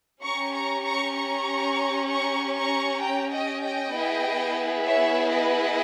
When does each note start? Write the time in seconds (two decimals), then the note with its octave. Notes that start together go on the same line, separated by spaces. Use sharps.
0.22 C#4 G4 A#5 C#6
0.53 A#5 C#6
0.83 A#5 C#6
1.14 A#5 C#6
2.07 A#5 C#6
2.53 A#5 C#6
2.99 G5 A#5
3.31 D#5 G5
3.61 D#5 G5
3.93 B3 E4 G#4
4.85 C#5 E5
5.31 B4 D#5